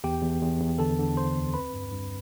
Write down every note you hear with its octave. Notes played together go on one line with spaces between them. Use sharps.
E2 G4 G5
E2
E2
E2
D3 A4 A5
D3
D3 C5 C6
D2
C4 B4 B5
G2
G2